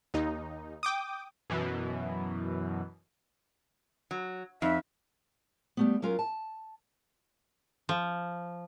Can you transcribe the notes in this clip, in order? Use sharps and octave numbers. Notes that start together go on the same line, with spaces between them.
D#2 D#4
G5 D6 D#6
F#2 B2 E3
F#3
F2 D#4 E5
G3 A3 B3
F#3 C#4 F4 A#4 F5
A5
F3